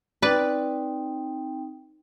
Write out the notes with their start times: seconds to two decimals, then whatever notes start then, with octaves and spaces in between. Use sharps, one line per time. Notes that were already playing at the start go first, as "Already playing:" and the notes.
0.22 C4 D#4 B4 D5 G5